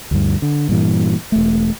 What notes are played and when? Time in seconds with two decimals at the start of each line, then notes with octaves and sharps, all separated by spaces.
0.11 D2 G2
0.42 D3
0.69 G2 A#2 E3
1.32 E1 A3